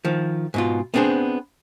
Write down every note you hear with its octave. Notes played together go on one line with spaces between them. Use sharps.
D#3 F3
G#2 B2 F4
B3 C4 D4 G#4 C5